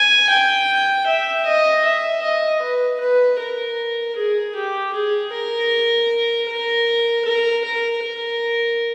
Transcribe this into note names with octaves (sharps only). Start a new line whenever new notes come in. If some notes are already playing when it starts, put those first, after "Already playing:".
Already playing: G#5
G5
E5
D#5
E5
D#5
B4
B4
A#4
G#4
G4
G#4
A#4
A#4
A#4
A#4
A#4